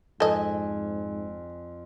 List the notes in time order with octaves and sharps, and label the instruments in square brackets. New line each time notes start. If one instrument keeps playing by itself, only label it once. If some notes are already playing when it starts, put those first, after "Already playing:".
[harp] F2 G#5 E7 [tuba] G#2 [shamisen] A4 D#5